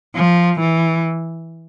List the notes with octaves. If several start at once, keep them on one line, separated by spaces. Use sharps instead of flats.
F3
E3